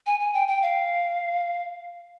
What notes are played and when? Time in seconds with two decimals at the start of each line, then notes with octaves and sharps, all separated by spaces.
0.07 G#5
0.20 G#5
0.34 G5
0.48 G5
0.62 F5